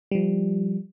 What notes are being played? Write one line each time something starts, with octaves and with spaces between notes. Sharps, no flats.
F3 G3